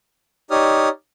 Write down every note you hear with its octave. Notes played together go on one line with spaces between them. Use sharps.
D#4 G4 C#5 D5 D#6 F6